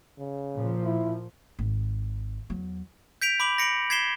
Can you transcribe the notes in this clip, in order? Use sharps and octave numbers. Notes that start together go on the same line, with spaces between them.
C#3
A#2 F3
E4
G#1
E2 F#3
G6 B6 D7 F7
B5 D6 F#7
A#6 C#7 D7 F#7
G#6 B6 C7 E7 G7